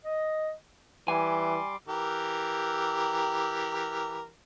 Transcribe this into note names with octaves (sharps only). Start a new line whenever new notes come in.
D#5
E3 G3 G#5 C6 D6
E3 G4 A#4